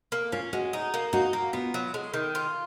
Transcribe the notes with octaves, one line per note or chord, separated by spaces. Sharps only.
A#3
C#4 F4
G#3 F#4
D#4
A#3
D#4 F#4
A#3
B3 F4
F#3
G#3
D#3
F4